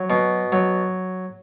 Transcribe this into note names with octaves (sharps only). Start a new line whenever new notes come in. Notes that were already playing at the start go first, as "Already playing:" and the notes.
Already playing: F#3
B2
F#3